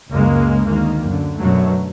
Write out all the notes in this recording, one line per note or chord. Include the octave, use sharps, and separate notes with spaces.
C#2 F#2 C#3 G#3 A#3
D2 D#3 A#3
F#2 D3
F#2 B2 D3 F#3 A3